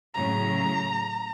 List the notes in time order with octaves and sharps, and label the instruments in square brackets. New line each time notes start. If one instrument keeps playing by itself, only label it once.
[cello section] A2 C#3 F#3 [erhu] A#5